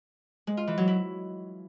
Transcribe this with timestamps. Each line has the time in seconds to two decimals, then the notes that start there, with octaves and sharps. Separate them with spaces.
0.47 G#3
0.57 F4
0.67 E3
0.78 F#3
0.88 E4